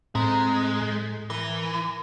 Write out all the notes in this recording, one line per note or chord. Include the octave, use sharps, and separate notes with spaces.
A2 G#3 C4 A#5
A2
E3 A#4